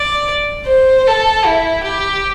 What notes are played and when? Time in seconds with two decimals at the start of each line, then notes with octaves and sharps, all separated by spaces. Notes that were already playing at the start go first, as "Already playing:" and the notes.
Already playing: D5
0.67 C5
1.07 A4
1.45 E4
1.85 G4